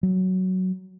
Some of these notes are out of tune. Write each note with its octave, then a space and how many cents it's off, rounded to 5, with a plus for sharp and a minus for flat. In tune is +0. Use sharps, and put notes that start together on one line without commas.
F#3 +5